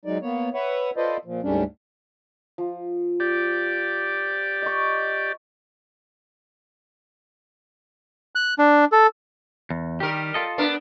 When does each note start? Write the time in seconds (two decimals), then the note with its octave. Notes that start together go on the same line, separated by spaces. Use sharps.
0.05 F#3 G#3 D#4 D5
0.22 A#3 B3 C#5
0.54 B4 C#5 E5 F#5
0.97 F4 A4 B4 C5 D5 D#5
1.25 A#2 F3
1.43 D2 G#2 G3 A3 C#4 D4
2.58 F3
3.20 G4 D5
4.62 D#5 C#6
8.35 F#6
8.58 D4
8.92 A4
9.70 E2
10.00 D#3 G3 G4 A#4
10.34 F4 A4 D#5
10.58 B3 D4 A#4